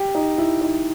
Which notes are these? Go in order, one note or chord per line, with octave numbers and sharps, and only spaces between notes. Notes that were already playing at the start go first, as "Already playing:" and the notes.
Already playing: G4
D#4
E4
D#4